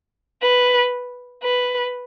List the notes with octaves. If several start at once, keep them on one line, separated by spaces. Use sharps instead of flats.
B4
B4